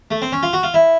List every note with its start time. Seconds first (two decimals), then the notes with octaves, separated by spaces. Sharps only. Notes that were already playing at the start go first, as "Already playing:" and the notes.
0.11 A3
0.22 C4
0.32 C#4
0.43 F4
0.53 F#4
0.63 F4
0.74 E4